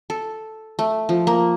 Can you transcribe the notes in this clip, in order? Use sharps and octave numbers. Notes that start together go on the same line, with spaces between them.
A4
A3
F3
A#3